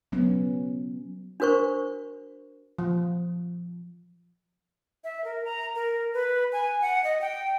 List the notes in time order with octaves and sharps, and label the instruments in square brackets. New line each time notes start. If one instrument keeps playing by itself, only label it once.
[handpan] F#3 B3 C#4
[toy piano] D4 F#4 A#4 C5 C#6
[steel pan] F3
[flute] E5
A#4
A#5
A#4
B4
G#5
F#5
D#5
G5